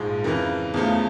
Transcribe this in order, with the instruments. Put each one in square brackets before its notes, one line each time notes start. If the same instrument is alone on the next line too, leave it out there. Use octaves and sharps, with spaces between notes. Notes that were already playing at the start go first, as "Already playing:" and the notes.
Already playing: [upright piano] A#1 G#2 F3 G#3
F2 C#3 E3 A#4
E2 C#3 F3 A3